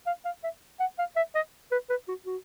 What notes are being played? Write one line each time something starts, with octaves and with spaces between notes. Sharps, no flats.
F5
F5
E5
F#5
F5
E5
D#5
B4
B4
F#4
F#4